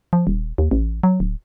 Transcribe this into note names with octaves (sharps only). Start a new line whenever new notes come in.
F3
D#1
D#2
A1
F#3
D1